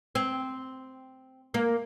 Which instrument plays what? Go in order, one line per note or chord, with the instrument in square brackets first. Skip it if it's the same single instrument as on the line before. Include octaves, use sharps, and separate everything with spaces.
[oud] C4
A#3